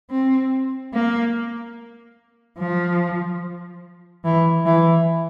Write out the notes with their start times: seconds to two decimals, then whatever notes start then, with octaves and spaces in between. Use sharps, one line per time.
0.11 C4
0.94 A#3
2.59 F3
4.25 E3
4.66 E3